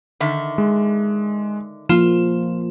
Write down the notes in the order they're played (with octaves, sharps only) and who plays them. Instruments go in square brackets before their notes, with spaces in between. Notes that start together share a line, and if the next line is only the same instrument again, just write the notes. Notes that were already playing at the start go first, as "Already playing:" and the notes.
[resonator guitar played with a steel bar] D3 D#3 E5
[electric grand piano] G#3
[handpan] F3 A#3 [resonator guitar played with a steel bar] F4 [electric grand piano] E7